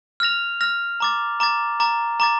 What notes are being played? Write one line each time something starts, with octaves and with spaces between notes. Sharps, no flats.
F6 A#6 F7
F6 A#6 F7
A#5 D6 A6
A#5 D6 A6
A#5 D6 A6
A#5 D6 A6